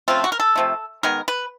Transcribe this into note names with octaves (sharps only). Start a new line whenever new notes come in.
C#3 F3 A3 C4 F4
F#4
A#4
A4
C3 F3 A3
D#3 G#3 B3 A#4
B4